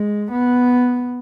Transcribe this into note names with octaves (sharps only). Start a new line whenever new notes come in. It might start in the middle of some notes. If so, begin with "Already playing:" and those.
Already playing: G#3
B3